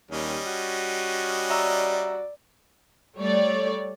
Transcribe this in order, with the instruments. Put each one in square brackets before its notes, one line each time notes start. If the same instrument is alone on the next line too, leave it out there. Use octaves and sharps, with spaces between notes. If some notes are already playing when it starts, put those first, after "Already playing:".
[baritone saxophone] D#2 [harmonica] G3 C#4 D#5
[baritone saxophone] F#4
[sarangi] D5 [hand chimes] E5 A#5 E6
[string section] G3 A3 C#5 D5